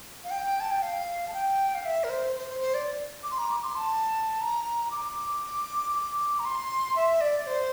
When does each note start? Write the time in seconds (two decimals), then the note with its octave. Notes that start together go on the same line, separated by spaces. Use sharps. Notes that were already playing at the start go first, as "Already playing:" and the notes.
0.24 F5
0.30 G5
0.60 A5
0.71 G5
0.82 F5
1.28 A5
1.33 G5
1.74 F5
1.85 E5
2.04 A#4
2.10 C5
2.35 C5
2.49 C5
2.61 C5
2.74 D5
3.23 D6
3.31 C6
3.38 A#5
3.51 D6
3.64 C6
3.76 A5
4.40 A#5
4.91 D6
6.39 A#5
6.45 C6
6.96 E5
7.21 D5
7.47 C5